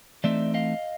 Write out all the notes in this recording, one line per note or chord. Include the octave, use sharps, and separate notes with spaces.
E3 A3 C4 D#4 D5 E5
D#5 F5